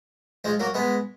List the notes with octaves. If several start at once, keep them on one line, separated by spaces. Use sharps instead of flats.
F3 G#3
F#3 A#3
G#3 B3